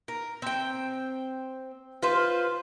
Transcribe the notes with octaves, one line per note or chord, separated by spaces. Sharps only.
A#4
C4 G5
F4 B4 C5